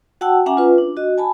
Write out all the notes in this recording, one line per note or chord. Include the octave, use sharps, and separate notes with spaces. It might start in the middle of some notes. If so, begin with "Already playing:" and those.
F#4 F#5 G5 A5 E6
C#4 E5 F#5 G#5 A#5 D6
F4 B4
D4
F#4 D#5
G#5 A5 B5